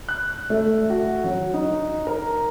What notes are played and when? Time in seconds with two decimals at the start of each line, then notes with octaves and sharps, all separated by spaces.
0.09 F#6
0.50 A3
0.90 F#4
1.24 F#3
1.54 D#4
2.07 A#4